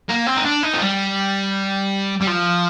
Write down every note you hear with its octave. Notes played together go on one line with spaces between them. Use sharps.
A#3
C4
D#4
D4
D#4
F3
G3
G3
F3